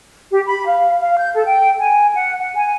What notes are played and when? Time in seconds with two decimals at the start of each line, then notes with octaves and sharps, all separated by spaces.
0.31 G4
0.46 B5
0.66 F5
1.00 F5
1.19 G6
1.34 A4
1.46 G5
1.79 G#5
2.14 F#5
2.40 F#5
2.54 G#5